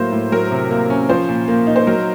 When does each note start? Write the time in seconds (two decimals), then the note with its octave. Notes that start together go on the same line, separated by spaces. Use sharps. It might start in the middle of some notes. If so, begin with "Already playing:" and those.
Already playing: A2 F#3 A#3 C5
0.12 A2
0.32 F#3 A#4
0.52 C3
0.71 A#3
0.90 C#4
1.09 F3 C5
1.29 A#2
1.48 A#3
1.67 D#4
1.76 C5
1.87 F#3 A#4